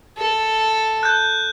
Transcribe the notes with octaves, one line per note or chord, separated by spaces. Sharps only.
A4
F#6 G6